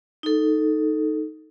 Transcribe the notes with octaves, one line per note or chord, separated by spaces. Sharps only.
D#4 A4